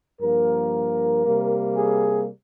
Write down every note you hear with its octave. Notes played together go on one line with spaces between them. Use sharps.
G2 F3 A#3 A#4
C3 G3 A#3
G#4